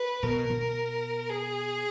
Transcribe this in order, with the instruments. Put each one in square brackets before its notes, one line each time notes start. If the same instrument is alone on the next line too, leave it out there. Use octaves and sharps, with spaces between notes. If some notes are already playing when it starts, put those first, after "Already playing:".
Already playing: [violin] B4
[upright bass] B2 [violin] A#4
[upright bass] B2
[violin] G#4